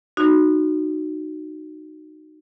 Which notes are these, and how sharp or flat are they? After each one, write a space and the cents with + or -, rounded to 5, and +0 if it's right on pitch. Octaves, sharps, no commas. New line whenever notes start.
D#4 -20 F#4 +5